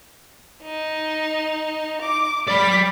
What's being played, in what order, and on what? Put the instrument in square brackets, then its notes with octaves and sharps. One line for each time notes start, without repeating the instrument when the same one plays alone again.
[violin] D#4
D6
[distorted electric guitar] D5 B5 [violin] B6